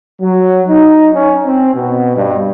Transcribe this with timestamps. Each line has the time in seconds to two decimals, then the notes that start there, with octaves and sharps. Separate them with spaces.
0.21 F#3
0.69 D#4
1.14 C#4
1.46 C4
1.75 B2
2.16 G2